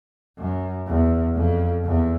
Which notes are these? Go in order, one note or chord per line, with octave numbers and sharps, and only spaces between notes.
F#2
E2
F2
E2